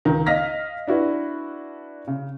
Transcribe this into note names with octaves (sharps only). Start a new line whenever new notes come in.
C#2 D#3 A#5
D#5 F5 F6 A#6 B6
D4 E4 F#4 B4
C#3